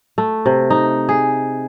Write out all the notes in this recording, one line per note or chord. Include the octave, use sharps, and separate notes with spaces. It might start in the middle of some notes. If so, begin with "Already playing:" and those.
A3
C3
D#4
G#4